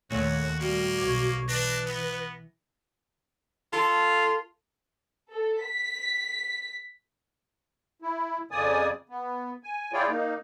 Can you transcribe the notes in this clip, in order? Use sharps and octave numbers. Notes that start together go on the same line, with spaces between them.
D#2 A#2 A3 F#4 C#5
G3 A#3 F#4
B1 C#6 D6 G#6
E3 D4 B4 A#6
B3
F4 A4
A4
B6
E4
F2 C#3 D5 G#5 D#6
B3
G#5
E4 F4 G#4 C#5 D5 G5
A#3 D#4